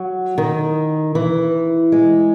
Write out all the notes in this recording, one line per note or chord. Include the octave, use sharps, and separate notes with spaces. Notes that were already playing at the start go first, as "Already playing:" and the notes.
Already playing: F#3
D#3
E3
G#3